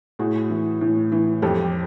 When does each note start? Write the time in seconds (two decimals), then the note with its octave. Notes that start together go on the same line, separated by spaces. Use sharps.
0.19 A2 F#4 G#4
0.50 E3
0.81 A2
1.12 E3
1.42 F2 G4 A4